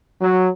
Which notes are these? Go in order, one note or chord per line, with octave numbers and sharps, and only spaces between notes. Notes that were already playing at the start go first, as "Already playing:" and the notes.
F#3